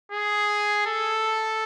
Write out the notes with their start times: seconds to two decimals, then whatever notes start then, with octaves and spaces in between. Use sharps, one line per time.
0.12 G#4
0.86 A4